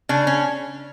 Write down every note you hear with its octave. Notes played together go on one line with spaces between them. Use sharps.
C#3 D4
C#4